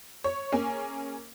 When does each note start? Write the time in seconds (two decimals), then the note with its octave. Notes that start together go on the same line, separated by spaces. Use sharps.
0.24 C#5
0.52 A#3 C#4 G#4